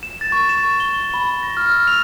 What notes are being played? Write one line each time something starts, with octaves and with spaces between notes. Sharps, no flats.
E7
A6
C#6
E7
G7
G7
B5
A#6
F6
E6
F7